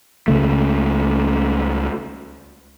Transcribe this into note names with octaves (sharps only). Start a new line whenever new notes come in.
C#2 C#3 A3